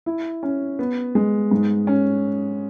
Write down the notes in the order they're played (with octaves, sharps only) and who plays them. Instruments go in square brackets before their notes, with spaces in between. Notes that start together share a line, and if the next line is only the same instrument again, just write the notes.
[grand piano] E4
C#4
B3
G#3
G#2
C#4